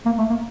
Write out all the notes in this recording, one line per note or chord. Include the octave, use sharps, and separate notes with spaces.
A#3
A3
A#3